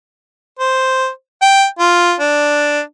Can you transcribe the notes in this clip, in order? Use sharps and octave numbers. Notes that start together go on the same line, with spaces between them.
C5
G5
F4
D4